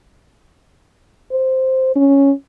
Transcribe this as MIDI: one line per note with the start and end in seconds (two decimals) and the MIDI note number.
1.32 1.95 72
1.96 2.32 61